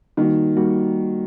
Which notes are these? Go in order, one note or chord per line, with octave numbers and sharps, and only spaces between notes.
D#3 G3 A#3 F#4
G3 A#3 F#4